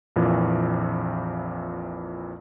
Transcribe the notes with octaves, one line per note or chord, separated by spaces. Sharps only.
A#1 F2 A#2 E3